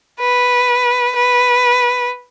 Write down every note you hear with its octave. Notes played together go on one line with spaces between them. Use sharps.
B4
B4